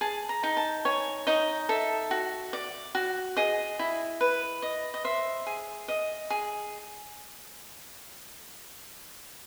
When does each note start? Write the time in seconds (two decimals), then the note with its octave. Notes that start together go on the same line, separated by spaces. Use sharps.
0.01 G#4 A5
0.29 A#5
0.43 D#4
0.57 A5
0.85 C#5 G#5
1.27 D#4 D#5
1.69 A4 E5
2.11 F#4
2.53 D5
2.95 F#4
3.37 G#4 D#5
3.79 E4
4.21 B4
4.62 D#5
4.94 D#5
5.04 C5 E5
5.46 G#4
5.88 D#5
6.30 G#4